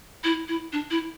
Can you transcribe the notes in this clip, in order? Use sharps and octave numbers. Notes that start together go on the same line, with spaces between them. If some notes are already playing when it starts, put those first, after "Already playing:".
E4
E4
D4
E4